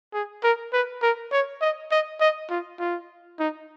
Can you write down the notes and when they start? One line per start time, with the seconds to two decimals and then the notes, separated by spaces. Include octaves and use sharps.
0.14 G#4
0.44 A#4
0.73 B4
1.02 A#4
1.32 C#5
1.62 D#5
1.91 D#5
2.20 D#5
2.50 F4
2.80 F4
3.39 D#4